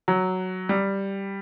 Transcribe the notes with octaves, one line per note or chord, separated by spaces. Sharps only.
F#3
G3